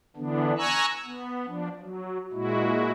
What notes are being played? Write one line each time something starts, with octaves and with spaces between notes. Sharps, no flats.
D3 E3 B3 D4
G#5 A#5 C#6 E6 F#6
B3
F3 D4
F#3
A#2 G#3 E4 F#4